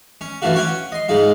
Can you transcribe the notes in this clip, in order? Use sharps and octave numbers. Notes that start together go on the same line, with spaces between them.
C#4
F#2 E3 A3 D4 F4 F#4
C#4 C#5 F#5 G5
D#5 C6
G#2 G#3 D#4 F4